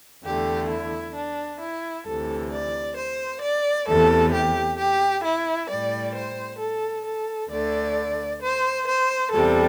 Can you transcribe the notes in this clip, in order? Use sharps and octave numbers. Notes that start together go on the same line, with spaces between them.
E2 D3 A3 G4
E4
D4
E4
D2 C3 E3 A4
D5
C5
D5
E2 C3 A3 A4
G4
G4
E4
A2 G3 D5
C5
A4
A4
D2 D3 A3 D5
C5
C5
E2 C3 G3 A4